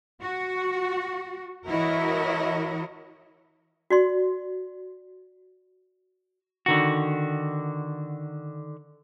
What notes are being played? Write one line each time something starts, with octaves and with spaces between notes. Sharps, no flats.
F#4
E3 E4 F#4 A#4 C#5 D#5
F#4 D5 C6
D3 D#3 F#4